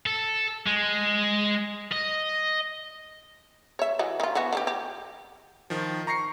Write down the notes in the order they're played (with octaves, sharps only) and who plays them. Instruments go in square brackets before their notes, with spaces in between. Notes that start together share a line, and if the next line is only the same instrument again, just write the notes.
[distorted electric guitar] A4
G#3
D#5
[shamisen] C#5 E5
E3 F#4 D#5
D#3 F4
E3 B3 F#4
D3 D4 G4
G4
[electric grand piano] D#3 F3
A#5 C#6 A#6 C7 C#7